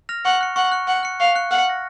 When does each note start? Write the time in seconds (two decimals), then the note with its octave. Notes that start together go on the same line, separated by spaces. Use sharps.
0.09 F6 A#6 F7
0.25 F#5 C#6
0.41 F#6 C#7
0.56 F#5 C#6
0.72 F#6 C#7
0.87 F#5 C#6
1.03 F#6 C#7
1.20 F5 C#6
1.35 F#6 C#7
1.51 F#5 F6
1.67 A#6 C#7